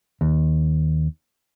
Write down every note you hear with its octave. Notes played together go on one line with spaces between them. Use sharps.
D#2